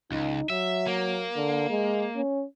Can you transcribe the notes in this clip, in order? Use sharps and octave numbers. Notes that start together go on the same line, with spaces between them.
C#2 D#4
F#3 E5
A#3
D3
G#3
C#4